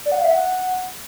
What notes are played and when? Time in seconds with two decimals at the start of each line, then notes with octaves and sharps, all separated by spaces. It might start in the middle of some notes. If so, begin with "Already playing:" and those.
0.05 D5
0.12 F#5
0.18 F5
0.24 E5
0.31 F#5